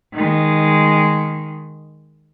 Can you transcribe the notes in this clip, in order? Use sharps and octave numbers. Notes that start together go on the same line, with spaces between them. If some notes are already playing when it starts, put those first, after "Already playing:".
D#3 G#3